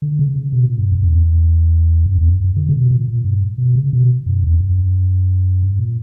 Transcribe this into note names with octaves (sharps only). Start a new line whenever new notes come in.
D3
C#3
C#3
B2
A#2
G2
F#2
E2
F#2
E2
F#2
F#2
D3
C#3
B2
A#2
A#2
G2
B2
C#3
B2
F#2
E2
F#2
G2
A#2